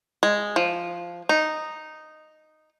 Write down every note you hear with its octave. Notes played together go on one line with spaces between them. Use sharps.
G#3
F3
D#4